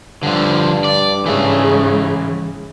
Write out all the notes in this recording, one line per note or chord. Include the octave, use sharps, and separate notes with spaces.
G2 D3 F3
D5
G#2 C#3 E3 A3